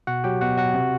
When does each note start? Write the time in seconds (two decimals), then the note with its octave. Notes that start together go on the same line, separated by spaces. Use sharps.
0.07 B2 F#4 F#5
0.24 F#3 G4 G5
0.41 B2 F#4 F#5
0.57 F#3 F#4 F#5
0.75 C3